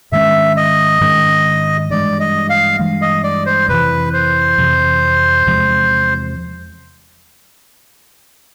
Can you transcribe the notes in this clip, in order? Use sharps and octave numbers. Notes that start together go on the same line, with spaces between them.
G#2 D#3 G#3 C#4 E5
D#5
G#2 D#3 G#3 C#4
G2 E3 G#3 D5
D#5
F5
G2 E3 G#3
D#5
D5
C5
F2 C3 E3 B4
C5
F2 C3 E3
E2 C3 F3 G#3